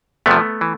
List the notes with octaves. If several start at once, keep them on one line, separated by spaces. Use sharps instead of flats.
E2 C3 F3 A3 B3
E3